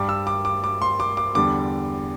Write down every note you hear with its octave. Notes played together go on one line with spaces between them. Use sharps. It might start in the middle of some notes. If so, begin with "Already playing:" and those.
Already playing: G2 G3 D6
E6
D6
D6
D6
C6
D6
D6
E2 D3 G3 D6